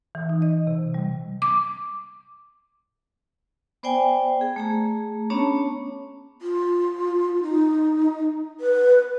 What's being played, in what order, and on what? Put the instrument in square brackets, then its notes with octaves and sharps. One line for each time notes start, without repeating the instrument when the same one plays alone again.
[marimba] E3
D#4
D#5
C3
G3
[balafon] D6
[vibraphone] B3 C5 D5 G5 G#5
G#4
A3 G#4 A#5
B3 C#4 D4 C#5 A5 A#5
[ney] F4
D#4
B4